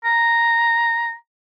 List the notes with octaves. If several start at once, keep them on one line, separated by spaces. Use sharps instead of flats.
A#5